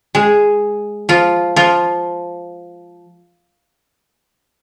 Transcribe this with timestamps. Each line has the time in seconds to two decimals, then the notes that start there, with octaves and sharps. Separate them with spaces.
0.15 G#3 G#4
1.09 F3 F4
1.56 F3 F4